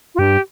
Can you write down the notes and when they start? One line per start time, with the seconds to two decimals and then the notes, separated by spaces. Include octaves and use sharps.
0.15 F4
0.19 G2 G4